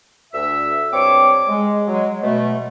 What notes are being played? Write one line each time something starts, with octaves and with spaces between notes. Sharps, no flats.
D2 E5 E6
G2 C4 C#5 D6
G#3
F#3 G#3
B2 A3